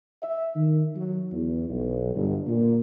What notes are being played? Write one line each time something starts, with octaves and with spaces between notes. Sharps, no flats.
E5
D#3
F#3
E2
B1
G1
A#2